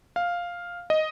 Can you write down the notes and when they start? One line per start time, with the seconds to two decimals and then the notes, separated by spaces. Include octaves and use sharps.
0.16 F5
0.90 D#5